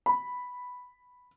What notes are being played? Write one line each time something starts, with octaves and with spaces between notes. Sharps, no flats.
B5